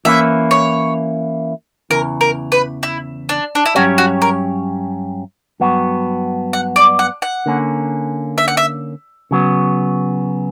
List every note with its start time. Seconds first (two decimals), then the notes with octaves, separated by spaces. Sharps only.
0.05 E3 A#3 C#4 E4 E5
0.51 C#5
1.90 E2 C#3 E3 A#4
2.21 A#4
2.52 B4
2.83 E4
3.29 D4
3.55 D4
3.66 E4
3.75 G2 F#3 C#4 F#4 G4 C#5
3.98 F#4
4.22 A#4
5.60 G2 F#3 B3 F#4
6.53 F#5
6.76 D5
6.99 F#5
7.22 F#5
7.46 D3 A#3 C#4
8.38 E5
8.48 F#5
8.57 E5
9.31 C#3 F#3 B3